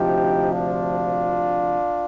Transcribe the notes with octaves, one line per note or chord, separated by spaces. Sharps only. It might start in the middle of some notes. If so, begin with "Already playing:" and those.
Already playing: D2 C3 F3 D#4 G4
D4 F4